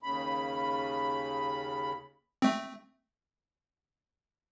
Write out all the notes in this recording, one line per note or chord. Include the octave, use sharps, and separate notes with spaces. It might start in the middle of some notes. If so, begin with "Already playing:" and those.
D#2 C#3 B5
A3 C4